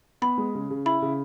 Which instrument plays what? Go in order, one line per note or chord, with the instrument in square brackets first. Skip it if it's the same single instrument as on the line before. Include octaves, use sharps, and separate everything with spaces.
[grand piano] B3 [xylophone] B5
[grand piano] G#3
C#3
C#3
[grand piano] E4 [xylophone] B5
[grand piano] C#3